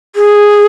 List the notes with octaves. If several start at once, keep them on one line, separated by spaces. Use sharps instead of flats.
G#4